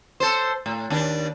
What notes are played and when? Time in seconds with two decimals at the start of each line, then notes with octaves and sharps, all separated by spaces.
0.20 A4 C5
0.66 A2
0.90 D#2 D4